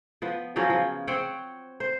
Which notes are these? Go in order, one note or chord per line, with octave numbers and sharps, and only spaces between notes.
F3 B3
C#3 F3 F#3 C#4
F3
C4 C#5 F#5 G5
C5